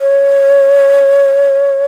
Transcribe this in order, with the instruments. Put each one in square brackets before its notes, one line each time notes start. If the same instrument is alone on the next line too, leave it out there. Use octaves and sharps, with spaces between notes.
[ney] C#5